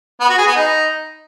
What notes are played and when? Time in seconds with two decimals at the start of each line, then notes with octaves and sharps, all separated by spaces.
0.21 B3
0.29 F#4
0.38 G#4
0.47 B3
0.56 D#4